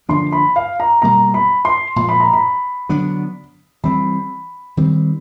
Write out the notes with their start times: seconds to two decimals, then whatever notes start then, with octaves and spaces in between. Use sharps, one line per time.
0.09 D3 F3 A#3 D4 C6
0.32 B5
0.56 F5
0.80 A#5
1.02 B2 G3 A#3 A#5
1.34 B5
1.65 C6
1.96 A#2 F3 G#3 C6
2.09 B5
2.20 A#5
2.33 B5
2.89 D3 F#3 B3 D4
3.83 E3 G3 C4 B5
4.77 D#3 G3 C4